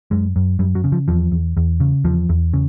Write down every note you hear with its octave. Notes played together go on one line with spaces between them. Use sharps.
F#2 G#3
F#2
F#2 G3
F#3
C#3
F3
E2 F3
E2
E2
C#3
E2 F3
E2
C#3